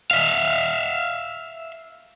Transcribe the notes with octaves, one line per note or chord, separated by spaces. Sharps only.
E5 F5